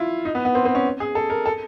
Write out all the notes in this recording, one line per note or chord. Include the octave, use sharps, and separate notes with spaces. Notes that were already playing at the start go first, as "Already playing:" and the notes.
Already playing: E4 F4
D#4
B3
B3
C4
C4
C#4
G#4
A4
A#4
A4